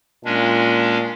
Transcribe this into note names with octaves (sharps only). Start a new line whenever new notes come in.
A#2 G#3 C#4 D4